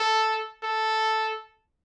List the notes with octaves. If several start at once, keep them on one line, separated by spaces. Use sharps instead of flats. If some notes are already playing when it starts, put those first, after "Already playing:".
Already playing: A4
A4